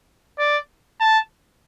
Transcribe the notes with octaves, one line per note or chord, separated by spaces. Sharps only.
D5
A5